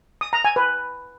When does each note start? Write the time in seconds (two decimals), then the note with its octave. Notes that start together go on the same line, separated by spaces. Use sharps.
0.21 D#6
0.33 A#5
0.44 G#5
0.56 B4